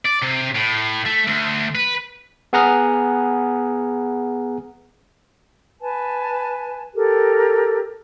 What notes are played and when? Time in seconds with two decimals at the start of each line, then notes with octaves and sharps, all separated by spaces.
0.06 D5
0.22 C3
0.55 A2
1.06 A3
1.28 D2
1.75 B4
2.53 B3 G#4 F#5 A#5 D#6 F6
5.81 B4 G#5 A5
6.95 G4 A4 A#4